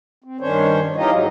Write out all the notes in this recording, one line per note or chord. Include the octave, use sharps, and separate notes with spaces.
C4
G2 D#3 C#4 D4 C5 C#5
E3 C#4 D#4 F4 G4 D#5
G#2 F#3